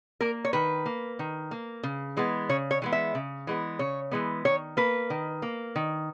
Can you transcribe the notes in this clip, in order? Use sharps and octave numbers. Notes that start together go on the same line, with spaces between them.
A#3 A#4
C#5
D#3 B4
A#3
D#3
A#3
C#3
E3 G#3 B3
C#3 C#5
C#5
E3 G#3 B3
E5
C#3
E3 G#3 B3
C#3 C#5
E3 G#3 B3
D#3 C#5
A#3 B4
D#3
A#3
D#3